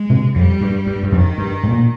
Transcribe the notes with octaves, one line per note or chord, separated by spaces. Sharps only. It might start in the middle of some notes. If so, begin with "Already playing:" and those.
Already playing: G#3
G#2 C3
F2 G3
G2
G2
G2
F2 D#3
G2
G#2
A#2